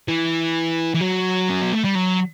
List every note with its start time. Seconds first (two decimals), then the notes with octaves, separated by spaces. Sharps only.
0.08 E3
0.95 E3
1.01 F#3
1.50 C#4
1.62 B3
1.73 A3
1.84 G3
1.95 F#3